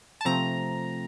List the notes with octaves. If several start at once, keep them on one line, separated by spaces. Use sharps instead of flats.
A5
C3 F3 A3 C4 A#5